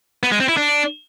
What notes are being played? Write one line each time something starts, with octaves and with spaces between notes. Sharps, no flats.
B3
G#3
C4
E4
D4